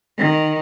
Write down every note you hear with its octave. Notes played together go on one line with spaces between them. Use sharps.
D#3